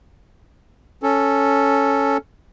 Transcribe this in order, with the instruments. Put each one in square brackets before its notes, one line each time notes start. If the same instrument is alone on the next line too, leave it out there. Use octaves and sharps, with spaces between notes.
[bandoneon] C#4 A4